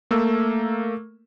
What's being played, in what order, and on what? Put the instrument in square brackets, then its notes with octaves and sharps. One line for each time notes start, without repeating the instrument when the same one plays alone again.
[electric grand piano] A3 A#3 E6